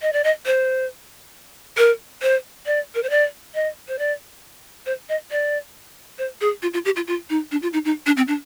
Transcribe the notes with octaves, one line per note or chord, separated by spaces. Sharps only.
D#5
D5
D#5
C5
A#4
C5
D5
A#4
C5
D5
D#5
C5
D5
C5
D#5
D5
C5
G#4
F4
F4
G4
F4
F4
D#4
D4
F4
D#4
D#4
D4
C4
D4